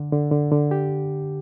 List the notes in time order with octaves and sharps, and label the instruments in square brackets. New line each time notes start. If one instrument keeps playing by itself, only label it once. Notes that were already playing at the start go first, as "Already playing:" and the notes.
Already playing: [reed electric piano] D3
D3
D3
D3
G4